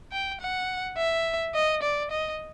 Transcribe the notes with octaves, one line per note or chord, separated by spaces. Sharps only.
G5
F#5
E5
D#5
D5
D#5